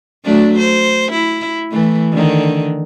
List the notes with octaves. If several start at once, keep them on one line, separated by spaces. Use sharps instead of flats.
F#3 A3 D4
C5
E4
E3 A3
D3 D#3